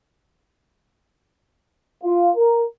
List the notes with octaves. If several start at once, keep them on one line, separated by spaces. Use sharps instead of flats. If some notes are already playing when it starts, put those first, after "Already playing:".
F4
A#4